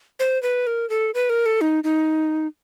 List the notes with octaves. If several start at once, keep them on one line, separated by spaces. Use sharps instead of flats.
C5
B4
A#4
A4
B4
A#4
A4
D#4
D#4